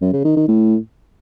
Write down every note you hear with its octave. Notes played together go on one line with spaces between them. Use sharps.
F#2
C#3
D#3
D#3
A2